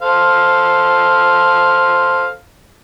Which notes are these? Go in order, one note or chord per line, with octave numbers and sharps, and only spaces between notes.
A4 C5 F5